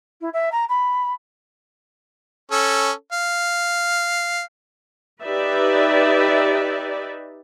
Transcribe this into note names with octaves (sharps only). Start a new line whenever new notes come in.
E4
E5
A#5
B5
C#4 A4
F5
D#4 G4 B4 D5 E5